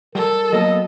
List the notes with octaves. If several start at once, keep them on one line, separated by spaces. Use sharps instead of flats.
G3 A4 A#4
F#3 A#3 B3 D#5